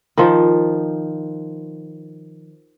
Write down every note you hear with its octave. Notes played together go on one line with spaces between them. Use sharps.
D#3 F3